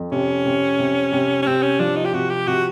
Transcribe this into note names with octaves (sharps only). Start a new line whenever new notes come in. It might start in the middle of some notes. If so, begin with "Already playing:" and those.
Already playing: F2
C3 C#4
C3
C3
C3
C#4
C3 C4
C#4
F3 D4
D#4
G4
C3 F#4
G4
C3 F#4